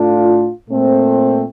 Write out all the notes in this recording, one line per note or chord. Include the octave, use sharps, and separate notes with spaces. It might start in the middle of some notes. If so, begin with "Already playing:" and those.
Already playing: A2 A3 D4 F4
A#2 A3 C4